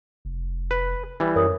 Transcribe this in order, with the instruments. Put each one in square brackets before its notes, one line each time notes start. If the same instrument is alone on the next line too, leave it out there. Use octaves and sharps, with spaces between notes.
[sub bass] F1
[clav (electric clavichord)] B4
E3 G3
[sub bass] F#2 [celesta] A#4 C#5 D#6